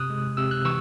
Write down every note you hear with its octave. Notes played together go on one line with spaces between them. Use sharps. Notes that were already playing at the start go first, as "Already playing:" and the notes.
Already playing: C3 D#6 F#6
G#3
C3 E6
F#6
E3 C#6 E6